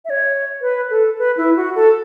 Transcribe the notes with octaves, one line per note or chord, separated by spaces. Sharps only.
E5
C#5
B4
A4
B4
E4
F#4
A4